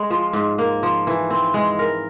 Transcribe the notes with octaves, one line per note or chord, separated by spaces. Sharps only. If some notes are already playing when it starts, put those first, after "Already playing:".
Already playing: G#3
F3
G#2
A#3
F3
E3
C4
G#3
A#4